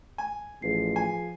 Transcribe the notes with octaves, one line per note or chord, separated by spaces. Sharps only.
G#5
A1 F3 G#4 B4 C7
G#5